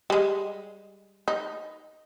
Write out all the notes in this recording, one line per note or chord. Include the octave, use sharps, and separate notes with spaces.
G3 G#3
D#4